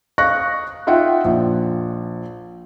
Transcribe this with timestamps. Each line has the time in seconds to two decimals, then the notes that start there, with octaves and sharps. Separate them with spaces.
0.18 D#5 F5 C#6 F#6 A#6
0.87 D#4 F4 E5 F#5 G5
1.24 A#1